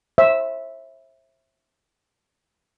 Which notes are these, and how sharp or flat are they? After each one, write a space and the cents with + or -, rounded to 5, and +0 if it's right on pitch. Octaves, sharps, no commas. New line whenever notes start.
C5 +40 E5 +0